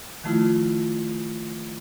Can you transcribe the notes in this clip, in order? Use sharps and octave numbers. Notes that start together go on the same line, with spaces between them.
D#3 F3 A3 E4 F4